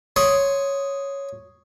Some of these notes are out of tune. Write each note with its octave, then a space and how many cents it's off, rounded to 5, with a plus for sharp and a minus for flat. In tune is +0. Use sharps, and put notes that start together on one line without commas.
C#5 +0 C6 +0 D#6 +0